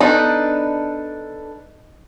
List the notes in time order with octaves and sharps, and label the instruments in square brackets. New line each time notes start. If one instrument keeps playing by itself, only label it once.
[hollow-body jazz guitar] B3 [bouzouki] D4 A4 B4 [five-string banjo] D#4